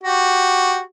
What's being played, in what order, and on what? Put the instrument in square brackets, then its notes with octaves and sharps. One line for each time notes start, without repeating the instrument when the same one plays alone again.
[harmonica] F#4 G4